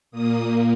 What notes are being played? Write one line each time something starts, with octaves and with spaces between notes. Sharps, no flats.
A#2 A#3 D#6